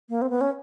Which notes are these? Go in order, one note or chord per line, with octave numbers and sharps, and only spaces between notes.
A#3
C4
B3
C#4